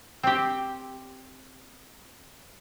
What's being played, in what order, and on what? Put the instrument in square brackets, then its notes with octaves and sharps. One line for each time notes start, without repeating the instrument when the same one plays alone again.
[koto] C4 G4